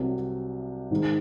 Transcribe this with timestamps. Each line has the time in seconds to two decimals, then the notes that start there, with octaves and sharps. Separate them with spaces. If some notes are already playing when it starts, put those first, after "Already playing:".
Already playing: C2 C3 F#3
0.91 G#2 D#3 G#3